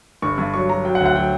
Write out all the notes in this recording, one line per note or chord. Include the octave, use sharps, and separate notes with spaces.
G1 C#6
G2
F#3 C#6
F#3 A#5
F#3 G5
F#5
D2
F#5
F#3 G5